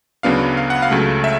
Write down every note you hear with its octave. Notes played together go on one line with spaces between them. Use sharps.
D2 C#3 F#3 B3 D4 F5
F5
F#5
F5
C#2 C#3 F#3 A3
E5